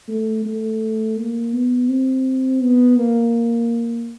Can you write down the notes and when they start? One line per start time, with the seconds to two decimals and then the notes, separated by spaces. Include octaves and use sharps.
0.08 A3
0.45 A3
1.17 A#3
1.53 B3
1.89 C4
2.61 B3
2.97 A#3